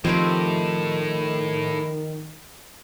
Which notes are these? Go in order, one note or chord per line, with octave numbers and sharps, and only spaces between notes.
A2 D#3 F3 C4 D#4 G4